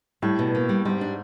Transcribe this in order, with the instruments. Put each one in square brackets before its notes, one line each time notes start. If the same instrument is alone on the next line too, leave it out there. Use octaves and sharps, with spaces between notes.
[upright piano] A2 [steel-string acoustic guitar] G3
[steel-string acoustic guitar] B2
A#3
G3
[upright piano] G#2 [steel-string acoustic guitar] G3
[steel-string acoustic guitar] D4